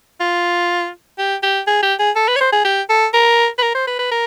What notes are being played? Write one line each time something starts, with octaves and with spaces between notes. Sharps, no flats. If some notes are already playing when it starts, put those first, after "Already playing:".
F4
G4
G4
G#4
G4
G#4
A4
B4
C#5
C5
G#4
G4
A4
A#4
B4
A#4
C5
B4
B4
A#4